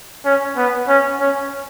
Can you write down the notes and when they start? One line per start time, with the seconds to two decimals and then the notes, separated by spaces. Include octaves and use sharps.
0.25 C#4
0.57 B3
0.88 C#4
1.20 C#4